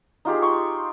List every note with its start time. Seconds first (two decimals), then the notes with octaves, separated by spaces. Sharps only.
0.25 D#4 F4 G4 G#4
0.42 C6 C#6